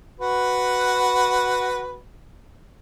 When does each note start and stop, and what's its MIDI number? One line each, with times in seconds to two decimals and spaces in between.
0.20 1.97 66
0.20 1.97 71